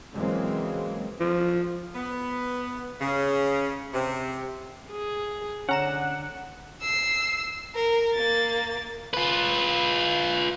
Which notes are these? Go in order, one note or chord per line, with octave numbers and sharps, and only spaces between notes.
C#3 E3 F#3 G#3 A#3 C4
F3
B3
C#3
C3
G#4
D3 C#4 F#5 A#5 E7
E6 C7
A#4
A#3 A6
F4 B4